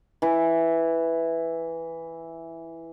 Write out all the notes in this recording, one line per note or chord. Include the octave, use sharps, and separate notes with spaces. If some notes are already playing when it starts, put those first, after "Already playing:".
E3 E4